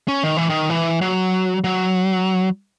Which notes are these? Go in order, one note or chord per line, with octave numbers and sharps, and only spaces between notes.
C#4
D#3
E3
D#3
E3
F#3
F#3